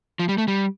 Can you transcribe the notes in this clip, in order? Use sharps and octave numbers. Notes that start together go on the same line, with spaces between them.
F3
G3
A3
G3